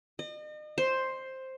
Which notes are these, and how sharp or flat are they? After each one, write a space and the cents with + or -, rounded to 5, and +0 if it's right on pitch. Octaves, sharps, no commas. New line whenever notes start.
D#5 -40
C5 +5